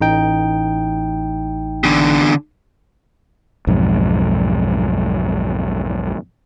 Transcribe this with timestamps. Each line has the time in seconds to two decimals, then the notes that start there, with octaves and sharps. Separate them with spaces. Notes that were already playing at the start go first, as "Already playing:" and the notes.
0.01 A1 D#4 G5
1.84 E2 D3
3.67 B1 F2 G#2